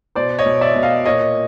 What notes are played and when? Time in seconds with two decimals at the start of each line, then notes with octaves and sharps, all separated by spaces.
0.15 B2 C5 D5
0.39 C#5 D#5
0.46 B2
0.61 D5 E5
0.75 B2
0.83 D#5 F5
1.05 A#2 C#5 D#5